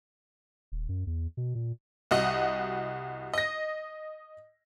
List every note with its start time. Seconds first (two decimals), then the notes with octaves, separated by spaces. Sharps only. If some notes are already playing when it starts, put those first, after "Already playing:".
0.72 D#1
0.89 F#2
1.07 E2
1.37 B2
1.55 A#2
2.11 C2 F#4 D#5
3.34 D#5 A#6